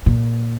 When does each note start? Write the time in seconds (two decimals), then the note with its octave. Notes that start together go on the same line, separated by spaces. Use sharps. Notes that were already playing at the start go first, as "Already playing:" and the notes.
0.06 A#2